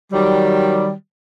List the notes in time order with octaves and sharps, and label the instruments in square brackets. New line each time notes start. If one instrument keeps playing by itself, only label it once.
[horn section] D#3 F#3 G3